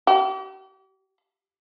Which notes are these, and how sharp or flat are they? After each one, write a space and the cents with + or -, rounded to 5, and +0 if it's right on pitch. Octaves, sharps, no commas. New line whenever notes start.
G4 -40